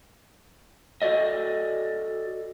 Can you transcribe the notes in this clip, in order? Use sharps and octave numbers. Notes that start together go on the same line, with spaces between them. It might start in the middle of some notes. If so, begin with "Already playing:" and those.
F#4 A4 D5 D#5